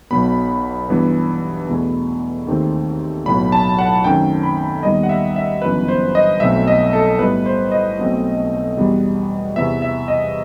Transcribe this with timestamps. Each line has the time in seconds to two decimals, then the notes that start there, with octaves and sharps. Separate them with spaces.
0.11 B1 B2 F#3 B3 B5
0.89 G2 E3 B3
1.68 E2 B2 A3
2.47 D#2 D#3 A3 C4
3.25 B1 A2 F#3 B3 B5
3.52 A5
3.78 F#5
4.04 F#2 D#3 A3 C4 G5
4.43 B5
4.83 D#2 D#3 G3 B3 D#5
5.03 F#5
5.09 E5
5.36 E5
5.62 G1 F#2 E3 B3 B4
5.88 C5
6.15 D#5
6.40 B1 B2 A3 C4 E5
6.68 D#5
6.93 A4
7.19 A2 G3 B3 B4
7.46 C5
7.72 D#5
7.99 B1 B2 A3 C4
8.77 E2 B2 G3 B3
9.56 E2 C3 E3 B3 E5
9.82 E5
10.08 D#5